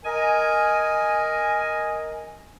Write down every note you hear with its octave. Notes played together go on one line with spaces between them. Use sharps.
A#4 D#5 G#5